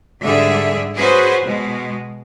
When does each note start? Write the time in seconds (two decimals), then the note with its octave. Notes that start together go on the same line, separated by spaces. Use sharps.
0.21 G#2 D3 G3 G#4 E5
0.96 C#4 F#4 G#4 B4 C5
1.42 B2 G#3